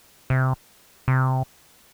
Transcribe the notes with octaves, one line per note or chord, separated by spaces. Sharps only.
C3
C3